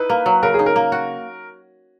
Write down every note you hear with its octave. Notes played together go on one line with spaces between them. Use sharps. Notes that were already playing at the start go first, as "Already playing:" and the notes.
Already playing: D#4 E4 B4
A#3
F#3
C#3 A#4
D#4 G#4
A#4
A#3
F#4